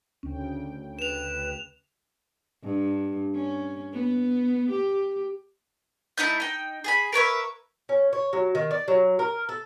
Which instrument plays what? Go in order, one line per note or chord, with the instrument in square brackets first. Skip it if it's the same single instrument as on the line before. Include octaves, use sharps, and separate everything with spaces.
[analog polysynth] D2 C#3 G5 [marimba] C#4
[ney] B4 [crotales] E7 F7
[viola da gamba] G2
C#4
B3
G4
[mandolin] A3 D#4 E4 G6
D#4 G5
G#4 G#5 B5
A#4 B4 C#5 E5
[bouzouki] C#4
C#5
F#3
D#3
D5
F#3
A#4
A4